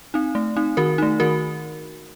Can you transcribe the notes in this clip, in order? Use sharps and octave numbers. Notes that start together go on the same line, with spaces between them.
C4 D#4
A3
C4 D#4
D#3 F#4 A#4
A3 D#4
D#3 F#4 A#4